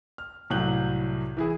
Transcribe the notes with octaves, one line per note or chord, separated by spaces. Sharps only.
F6
C2 A2 F#3 F#6 G6 F#7
E3 E4 G#4